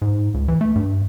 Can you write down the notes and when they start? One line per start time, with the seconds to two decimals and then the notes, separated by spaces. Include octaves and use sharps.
0.02 G#2
0.34 C#2
0.48 E3
0.61 A3
0.76 G2